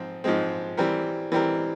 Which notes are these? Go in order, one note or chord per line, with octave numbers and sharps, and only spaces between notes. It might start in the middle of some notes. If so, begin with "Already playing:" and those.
Already playing: G#2 F3 C4
G#2 F3 G#3 C4
E3 G3 C4 G4 A#4
E3 G3 C4 G4 A#4